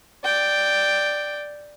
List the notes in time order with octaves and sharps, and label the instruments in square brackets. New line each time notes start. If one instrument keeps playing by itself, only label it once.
[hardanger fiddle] D5 G5